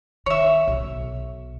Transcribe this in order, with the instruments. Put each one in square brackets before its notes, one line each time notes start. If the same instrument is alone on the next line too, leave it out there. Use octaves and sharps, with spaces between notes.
[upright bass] D#3 [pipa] C#5 E5
[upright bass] B1